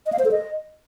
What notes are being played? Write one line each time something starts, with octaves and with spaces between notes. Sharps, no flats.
D#5
F5
C5
A4
D#5